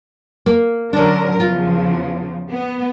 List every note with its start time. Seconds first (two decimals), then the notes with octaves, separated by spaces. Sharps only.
0.46 A#3
0.93 D3 F#3 C#4 D4 A#4
1.40 E2 C#3 F3 F4
2.50 B3